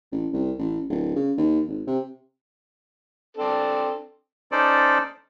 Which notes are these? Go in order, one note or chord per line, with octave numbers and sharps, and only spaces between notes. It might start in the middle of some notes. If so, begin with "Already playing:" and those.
A1
C2
A1
D1
C#3
D#2
G#1
C3
C4 D4 A4
C#4 D#4 A4 C5 D5